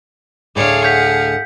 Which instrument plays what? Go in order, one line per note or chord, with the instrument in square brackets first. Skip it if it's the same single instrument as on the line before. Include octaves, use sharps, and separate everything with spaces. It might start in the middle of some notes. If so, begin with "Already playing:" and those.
[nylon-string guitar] D2 A2 [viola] G#4 F5 [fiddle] C#5 D5
[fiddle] F#5 [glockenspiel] G6 B6